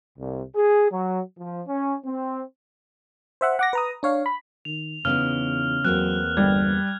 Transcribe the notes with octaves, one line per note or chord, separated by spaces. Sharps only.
C2
G#4
F#3
F3
C#4
C4
C5 E5 F#5
F#5 D6 A#6
B4 A#5 D#6
D4 C#5 F5
B5
D#3 F7
E2 C#3 B3 D#4 F6
E2 F#3 A#3 C4 F#6
G1 G3 G#6